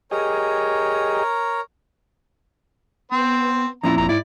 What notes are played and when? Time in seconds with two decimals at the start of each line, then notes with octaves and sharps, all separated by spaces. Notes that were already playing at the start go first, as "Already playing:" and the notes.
0.11 G4 G#4 A#4 C#5 D#5 A#5
3.12 B3 C4 C5
3.83 F2 A#2 C#4 E4 A#5
3.98 F1 A#5
4.09 G#2 E4 D5